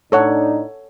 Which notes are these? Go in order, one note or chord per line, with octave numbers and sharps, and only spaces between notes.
A2 D4 D#4 A4 C#5 F#5